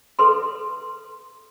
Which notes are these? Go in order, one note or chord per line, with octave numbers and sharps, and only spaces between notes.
A4 B4 C6